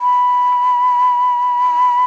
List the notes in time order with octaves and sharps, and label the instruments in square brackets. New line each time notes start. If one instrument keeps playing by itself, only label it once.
[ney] B5